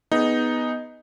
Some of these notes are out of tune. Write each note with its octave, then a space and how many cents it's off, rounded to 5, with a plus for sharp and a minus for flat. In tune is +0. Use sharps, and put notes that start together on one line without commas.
B3 +0 D#4 +0 G#4 +0